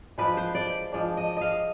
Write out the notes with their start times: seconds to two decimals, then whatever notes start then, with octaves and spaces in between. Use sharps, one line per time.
0.18 F3 G#3 D4 B4
0.37 C5
0.55 D5
0.92 F3 G#3 D4
1.17 D#5
1.37 D#5 F5